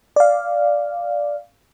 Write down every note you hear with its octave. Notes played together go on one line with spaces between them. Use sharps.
D5 F5